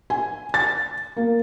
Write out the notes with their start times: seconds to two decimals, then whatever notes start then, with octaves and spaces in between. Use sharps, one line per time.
0.10 G#5
0.54 A6
1.17 A#3